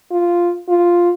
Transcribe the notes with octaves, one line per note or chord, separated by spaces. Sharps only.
F4
F4